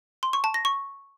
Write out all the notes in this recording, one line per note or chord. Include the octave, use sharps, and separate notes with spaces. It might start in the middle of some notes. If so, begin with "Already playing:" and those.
C6
C#6
A5
A#6
C#6